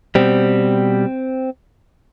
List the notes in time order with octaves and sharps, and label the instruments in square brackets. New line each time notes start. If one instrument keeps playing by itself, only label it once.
[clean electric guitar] B2 G3 C4